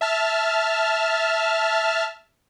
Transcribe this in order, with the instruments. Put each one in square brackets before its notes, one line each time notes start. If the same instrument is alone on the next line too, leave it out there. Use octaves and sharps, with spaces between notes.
[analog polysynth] E5 A5 F6